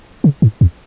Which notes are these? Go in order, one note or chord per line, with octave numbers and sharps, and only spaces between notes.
C#3
G#2
E2